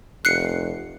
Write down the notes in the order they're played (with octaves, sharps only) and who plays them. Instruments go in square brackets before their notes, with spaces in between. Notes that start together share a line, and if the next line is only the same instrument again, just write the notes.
[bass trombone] F1 [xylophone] F#6 C7 C#7